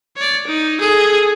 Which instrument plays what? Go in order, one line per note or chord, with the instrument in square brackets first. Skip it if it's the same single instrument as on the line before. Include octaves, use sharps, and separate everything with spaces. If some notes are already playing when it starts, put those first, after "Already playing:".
[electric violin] C#5 D5
D#4
G#4 A4